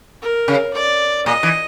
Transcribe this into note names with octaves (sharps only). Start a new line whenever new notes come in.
A#4
C#3
D5
A#2 D#5
E3